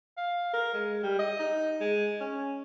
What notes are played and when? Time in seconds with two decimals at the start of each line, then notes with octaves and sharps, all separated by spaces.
0.17 F5
0.54 A#4
0.74 G#3
1.03 G3
1.19 D#5
1.40 D#4
1.81 G#3
2.20 C#4